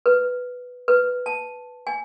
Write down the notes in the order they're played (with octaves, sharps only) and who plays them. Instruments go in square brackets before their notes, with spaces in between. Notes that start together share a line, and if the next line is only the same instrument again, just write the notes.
[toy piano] B4
B4
A5
G#5